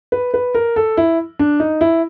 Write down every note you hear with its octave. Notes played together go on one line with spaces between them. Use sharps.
B4
B4
A#4
A4
E4
D4
D#4
E4